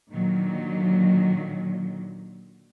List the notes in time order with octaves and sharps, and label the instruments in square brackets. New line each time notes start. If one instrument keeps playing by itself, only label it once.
[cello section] A#2 D3 D#3 F#3